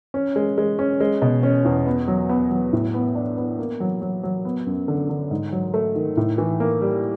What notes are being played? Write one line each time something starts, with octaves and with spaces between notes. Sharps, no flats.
C#4
G#3
G#3
C#4
G#3
B2
C#4
E2
B3
F#3
B3
F#3
A2
B3
D4
B3
A#3
F#3
F#3
F#3
B3
F#2
D3
D3
G#2
F#3
A3
D#3
A2
E3
A#3
G3